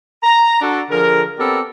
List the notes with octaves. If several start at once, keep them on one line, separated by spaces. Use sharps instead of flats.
A#5
D4 F#4 A4
D3 F3 G#4 A#4
B3 C4 G4 A4 A#4 D5